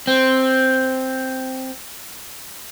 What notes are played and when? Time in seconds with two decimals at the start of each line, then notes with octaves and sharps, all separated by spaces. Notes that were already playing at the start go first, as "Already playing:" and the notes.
0.07 C4